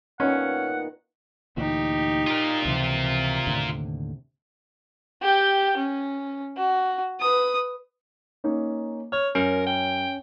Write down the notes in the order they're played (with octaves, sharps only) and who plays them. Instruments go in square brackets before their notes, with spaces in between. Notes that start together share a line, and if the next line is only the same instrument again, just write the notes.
[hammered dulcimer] A#2 D#3 B3 [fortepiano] C#4 [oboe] F#5
[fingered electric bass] D2 A#2 E3 [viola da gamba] D#4 G4
[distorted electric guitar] F4 A#4
[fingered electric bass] C#2 E3 F3 [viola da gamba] C3
[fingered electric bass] D#2 A2 D3
[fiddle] G4 G5
C#4
F#4
B4 D#6
[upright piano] A#3 C#4 D#4
[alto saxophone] C#5 [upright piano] F6
[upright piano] F#2 C#7 [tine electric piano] C#4 [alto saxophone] A#4
[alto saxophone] G5